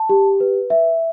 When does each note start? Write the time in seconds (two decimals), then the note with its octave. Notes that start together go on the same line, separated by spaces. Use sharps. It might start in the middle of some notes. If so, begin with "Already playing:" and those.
Already playing: A5
0.09 G4
0.40 B4
0.70 E5